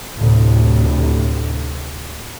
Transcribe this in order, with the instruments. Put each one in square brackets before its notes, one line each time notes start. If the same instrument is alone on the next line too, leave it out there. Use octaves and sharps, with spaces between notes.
[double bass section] D2 A2 C3